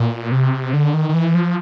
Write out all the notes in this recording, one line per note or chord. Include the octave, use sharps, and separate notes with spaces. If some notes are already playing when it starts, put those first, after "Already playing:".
Already playing: A#2
C3
D3
D#3
D#3
E3
F3